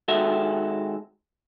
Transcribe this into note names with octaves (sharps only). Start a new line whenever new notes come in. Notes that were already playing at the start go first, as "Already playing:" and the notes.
D#3 G#3 F#4 A4 E5